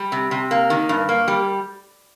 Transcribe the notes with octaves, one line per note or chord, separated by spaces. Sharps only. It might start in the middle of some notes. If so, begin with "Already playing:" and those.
Already playing: G3
C3
C3
A#3
D#3
G2
A#3
G3